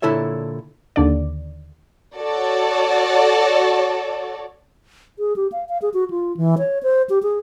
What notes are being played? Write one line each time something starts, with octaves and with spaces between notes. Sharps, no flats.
A#2 D3 E4 A4 C#5 E5
D#2 D3 D5
F#4 A4 C#5 D5
G#4
G4
F5
F5
G#4
F#4
F4
E3
C#5
C5
G4
G#4